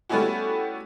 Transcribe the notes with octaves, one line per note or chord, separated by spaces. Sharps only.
G3 A3 B3 C#4 E4 F#4